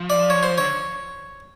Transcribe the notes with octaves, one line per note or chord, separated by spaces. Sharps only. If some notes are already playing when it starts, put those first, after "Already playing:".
Already playing: F3
D5
C#5
C5
D3 C#5